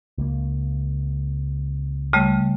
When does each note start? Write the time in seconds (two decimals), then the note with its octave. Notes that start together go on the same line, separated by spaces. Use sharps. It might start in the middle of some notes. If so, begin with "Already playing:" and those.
0.18 C#2 A#3
2.13 C#3 G3 A3